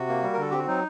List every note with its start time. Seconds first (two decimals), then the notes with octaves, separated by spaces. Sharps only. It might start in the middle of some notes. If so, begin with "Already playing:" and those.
Already playing: C3 F#4
0.09 A#3
0.23 G3
0.33 A#4
0.38 D3 A4
0.50 C4 G4
0.58 F#4
0.67 F#3 D#4